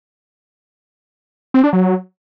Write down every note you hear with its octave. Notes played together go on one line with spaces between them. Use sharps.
C4
D4
F#3